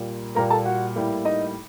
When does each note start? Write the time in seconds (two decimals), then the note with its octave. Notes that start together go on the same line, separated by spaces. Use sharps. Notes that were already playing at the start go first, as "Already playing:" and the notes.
Already playing: A#2 G3 A#3
0.35 A#2 G3 A#3 A#4 A#5
0.50 A4 A5
0.65 F#4 F#5
0.96 A2 G3 A#3
1.25 D#4 D#5